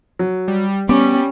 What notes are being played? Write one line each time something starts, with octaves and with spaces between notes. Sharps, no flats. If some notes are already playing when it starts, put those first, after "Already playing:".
F#3
G3
G3 B3 C#4 D6